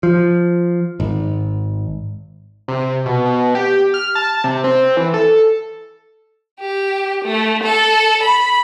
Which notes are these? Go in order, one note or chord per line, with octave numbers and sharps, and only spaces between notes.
F3
G#1
C3
B2
B2
G4
F6
A5
C3
C4
E3
A4
G4
A3
A4
B5